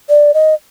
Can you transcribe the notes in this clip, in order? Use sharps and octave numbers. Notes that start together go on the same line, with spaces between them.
D5
D#5